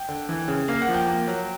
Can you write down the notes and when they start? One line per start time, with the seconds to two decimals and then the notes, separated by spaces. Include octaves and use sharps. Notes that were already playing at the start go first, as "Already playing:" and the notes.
Already playing: G5
0.09 D3
0.29 E3
0.48 C#3
0.68 A#3 F5
0.82 F#5
0.88 F3
0.94 G5
1.08 A#3
1.28 F#3